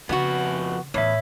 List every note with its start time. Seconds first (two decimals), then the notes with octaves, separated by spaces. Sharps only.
0.09 F2 C#3 B3 F#4 F#5
0.94 E2 A2 C#5 E5